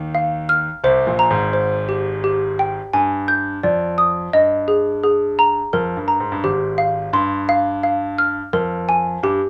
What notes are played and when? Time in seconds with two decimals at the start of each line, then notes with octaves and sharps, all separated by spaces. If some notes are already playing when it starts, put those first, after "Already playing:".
Already playing: D#2 D#3
0.15 F5
0.49 F6
0.84 C2 C3 C5
1.07 A#1 A#2
1.19 A#5
1.30 G#1 G#2
1.53 C5
1.89 G4
2.24 G4
2.59 G5
2.93 G2 G#5
3.28 G6
3.63 F2 D5
3.98 D#6
4.33 G2 D#5
4.68 G#4
5.03 G#4
5.39 A#5
5.73 F2 A#4
5.97 G2
6.08 A#5
6.20 G#2
6.32 G2
6.44 G#1 G#2 G4
6.78 F5
7.13 G2 C6
7.49 F5
7.83 F5
8.18 F6
8.53 F2 A#4
8.89 G#5
9.23 G2 G4